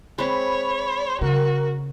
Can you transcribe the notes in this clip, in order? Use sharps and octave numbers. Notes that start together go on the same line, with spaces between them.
G#3 C4 C#5 B5
C#3 F#4 A#4